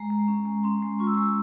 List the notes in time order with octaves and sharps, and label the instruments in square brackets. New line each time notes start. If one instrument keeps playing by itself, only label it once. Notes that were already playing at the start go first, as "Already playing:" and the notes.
Already playing: [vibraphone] G#3 A#5
G#3
C#4
G#3
C#4 C6
G#3
F4 C#6
E6
G#3 C#6